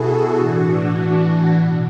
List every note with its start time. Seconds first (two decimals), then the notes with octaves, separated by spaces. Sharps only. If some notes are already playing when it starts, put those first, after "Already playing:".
Already playing: B2 E4 F#4 G#4 A4
0.35 A2 E3 D4 F#4
1.50 B2